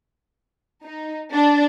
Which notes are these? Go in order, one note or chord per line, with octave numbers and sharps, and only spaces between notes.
D#4
D4